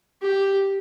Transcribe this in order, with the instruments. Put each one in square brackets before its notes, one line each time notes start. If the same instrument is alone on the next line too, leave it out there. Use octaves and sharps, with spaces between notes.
[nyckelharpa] G4